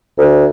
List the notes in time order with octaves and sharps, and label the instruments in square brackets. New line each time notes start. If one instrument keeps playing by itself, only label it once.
[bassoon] D2